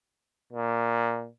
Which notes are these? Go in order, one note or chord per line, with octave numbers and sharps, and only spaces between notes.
A#2